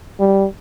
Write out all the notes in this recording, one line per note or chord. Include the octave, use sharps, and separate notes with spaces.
G3